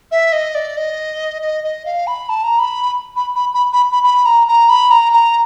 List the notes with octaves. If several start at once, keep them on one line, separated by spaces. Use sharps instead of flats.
E5
D#5
D5
D#5
D#5
D#5
F5
B5
A5
A#5
B5
B5
B5
B5
B5
B5
B5
A#5
A#5
B5
A#5
A#5